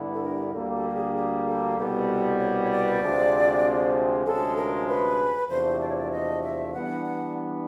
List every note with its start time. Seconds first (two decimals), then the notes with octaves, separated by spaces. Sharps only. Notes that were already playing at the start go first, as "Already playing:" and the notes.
Already playing: G2 D3 G3 B3 E4
0.13 A4
0.23 A#4
0.53 D2 D3 G3 A#3 A4
0.74 A4
0.88 G4
0.95 G#4
1.16 G#4
1.47 A4
1.77 C2 B2 G3 B3 A4
2.39 C#5
2.63 C#5
2.71 D5
3.01 D2 C3 F3 G#3 C4
4.25 D2 C3 F3 G#3 C#4 A4
4.57 A#4
4.88 B4
5.49 E2 C3 F3 A3 D4 C5
5.81 D5
5.89 C#5
5.97 D5
6.12 D#5
6.43 E5
6.74 E3 G3 B3 D4 F#5
7.05 F#5